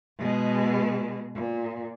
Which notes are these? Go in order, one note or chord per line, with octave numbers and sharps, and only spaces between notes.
B2 G#3
A#2